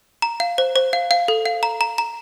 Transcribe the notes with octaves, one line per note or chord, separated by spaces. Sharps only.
A#5
F5
C5
C5
F5
F5
A4
F5
A#5
A#5
A#5